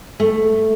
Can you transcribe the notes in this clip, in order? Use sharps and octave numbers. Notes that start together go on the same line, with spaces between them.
A3